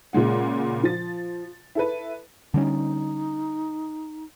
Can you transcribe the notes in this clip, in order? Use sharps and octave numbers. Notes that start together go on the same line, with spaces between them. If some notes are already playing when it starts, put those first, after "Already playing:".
A#2 C#3 G#3 F#5
F3 A6
E4 A4 B4
D3 G3 C#4 D#4